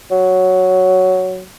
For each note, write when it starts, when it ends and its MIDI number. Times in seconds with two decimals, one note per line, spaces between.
0.11 1.45 54